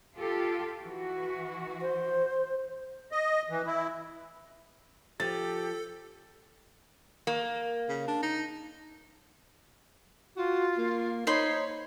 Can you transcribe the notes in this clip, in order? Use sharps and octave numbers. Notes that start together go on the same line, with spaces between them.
F4 G4 A4
E3 F#4
C5
D#5
E3
E4
F3 G4 A4 A6
A#3
C#3
D4
D#4
F4 F#4
A#3
D#4 C5 C#5 B5 C6